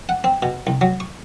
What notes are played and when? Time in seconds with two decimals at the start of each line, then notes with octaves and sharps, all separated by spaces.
0.09 F#5
0.24 C4
0.42 B2
0.67 C2
0.81 F#3
1.00 C#6